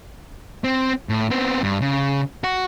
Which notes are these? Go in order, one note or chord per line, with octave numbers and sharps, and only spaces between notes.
C4
A2
B3 C4
G2
C#3
F#4